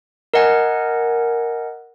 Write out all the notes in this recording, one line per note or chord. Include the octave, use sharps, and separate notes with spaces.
A#4 D#5 F#5 G#5